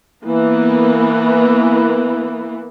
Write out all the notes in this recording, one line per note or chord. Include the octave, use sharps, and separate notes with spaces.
E3 A#3 B3